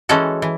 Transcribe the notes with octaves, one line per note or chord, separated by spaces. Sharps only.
E3 G#3 C#4 F#4 A4
E3